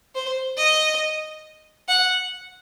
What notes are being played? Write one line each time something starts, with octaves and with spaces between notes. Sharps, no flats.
C5
D#5
F#5